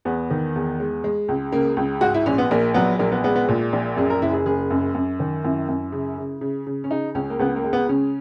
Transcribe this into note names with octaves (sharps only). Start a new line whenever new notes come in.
E2 B3
D#3
E2
G#3
G#3
C#2
C#3 A#3
C#2
G#2 F#4
E4
A#1 C#4
B3
A#1 A#3
F#3 B3
A#1 A#3
B3
G#3 B3
B3
A#2
A#1
F#2 G#4
A#4
F#1 E4
G#4
F#1 G#4
F#2
F#2
D#3
F#2 E4
F#2
C#3
C#3
C#3
C#3
C#4
C#3 D#4
C#2 C#4
A#3
C#2 B3
A#3
G#3
B3
C#3 C#4